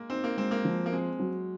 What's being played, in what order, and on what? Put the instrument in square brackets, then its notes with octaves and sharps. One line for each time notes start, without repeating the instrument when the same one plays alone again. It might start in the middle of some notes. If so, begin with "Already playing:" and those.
Already playing: [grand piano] G#3 A#3
[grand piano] C4 [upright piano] D#4
[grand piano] A#3
[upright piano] G#3 [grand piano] C4
[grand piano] A#3
[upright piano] F3
[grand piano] A#3
[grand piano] G#3 [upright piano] C4
[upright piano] F#3